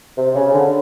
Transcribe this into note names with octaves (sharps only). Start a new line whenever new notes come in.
C3
C#3
D3